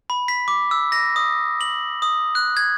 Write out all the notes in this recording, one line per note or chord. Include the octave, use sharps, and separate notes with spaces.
B5
B6
D6
E6
A#6
D#6
F#7
D#6
F#6
G#6